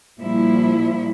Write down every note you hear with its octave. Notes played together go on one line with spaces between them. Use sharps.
A#2 F3 G3 E4